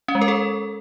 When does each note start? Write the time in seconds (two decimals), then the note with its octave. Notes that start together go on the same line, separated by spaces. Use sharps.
0.08 C#4
0.15 G#3
0.21 A#4
0.28 A4